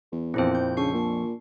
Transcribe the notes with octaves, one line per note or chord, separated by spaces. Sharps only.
E2
A#1 F2 C4 E4 C5
G6
C#3 D4 C#6 C7
A#2